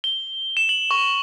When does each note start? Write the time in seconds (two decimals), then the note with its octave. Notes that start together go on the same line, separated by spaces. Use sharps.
0.04 G7
0.57 E7
0.69 F#7
0.91 C#6